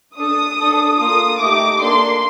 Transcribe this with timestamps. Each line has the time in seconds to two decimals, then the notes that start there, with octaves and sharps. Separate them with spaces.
0.18 D4 A4 D#6
0.59 D4 A4
0.99 A#3 F4 A4 D#6
1.41 A3 D#4 G4 D6
1.82 A#3 D4 A4 C6